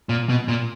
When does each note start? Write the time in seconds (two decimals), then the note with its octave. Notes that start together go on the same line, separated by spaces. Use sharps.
0.09 A#2
0.29 B2
0.48 A#2